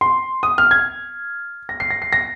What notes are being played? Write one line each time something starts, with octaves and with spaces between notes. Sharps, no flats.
C6
D#6
F6
G#6
A#6
C7
A#6
C7
A#6